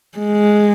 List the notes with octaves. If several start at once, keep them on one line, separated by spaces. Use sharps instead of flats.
G#3